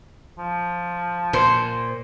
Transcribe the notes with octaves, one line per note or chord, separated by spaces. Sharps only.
F3
A#2 C5